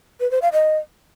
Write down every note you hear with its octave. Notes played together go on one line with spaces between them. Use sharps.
B4
C5
F5
D#5